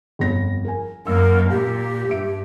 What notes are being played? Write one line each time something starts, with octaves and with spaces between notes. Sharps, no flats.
G1 F2 A#6
A#4 G#5
F#2 A#3 A#4 E6
A#2 G4
G2 E5 D7